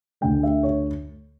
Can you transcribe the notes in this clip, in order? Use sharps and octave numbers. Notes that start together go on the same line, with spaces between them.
D2 D3 A3 G5
E5
C#5